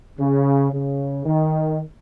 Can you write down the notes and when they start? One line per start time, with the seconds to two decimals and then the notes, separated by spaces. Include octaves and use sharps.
0.19 C#3
0.73 C#3
1.25 D#3